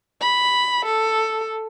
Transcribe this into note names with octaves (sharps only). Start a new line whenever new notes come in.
B5
A4